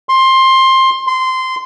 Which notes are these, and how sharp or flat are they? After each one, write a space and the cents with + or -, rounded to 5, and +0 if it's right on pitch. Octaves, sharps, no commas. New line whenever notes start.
C6 +15
C6 -15